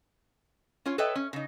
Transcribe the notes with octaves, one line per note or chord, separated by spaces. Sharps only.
C#4 F4 C#5
A4 B4 C#5 D#5 E5 G5
C#4
C#3 D#4